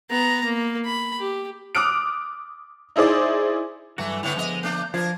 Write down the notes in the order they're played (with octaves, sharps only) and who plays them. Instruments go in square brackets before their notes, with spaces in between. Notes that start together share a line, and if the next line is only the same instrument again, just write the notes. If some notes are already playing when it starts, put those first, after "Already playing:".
[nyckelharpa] B3 A#5
A#3
B5
G4
[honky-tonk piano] D6 D#6 F6 F#6 D7
D#4 E4 G#4 C5 D5
[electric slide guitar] G2 F#3 F#4 [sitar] E3 A3
[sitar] A2 D3 B3 [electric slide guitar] E4 [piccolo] F7
[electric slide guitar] D3 F3 B3 [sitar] G#3 D#5
[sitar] A3 D4 [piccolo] G6
[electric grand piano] F3 [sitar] D4 A#4 [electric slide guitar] F5 [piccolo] G#6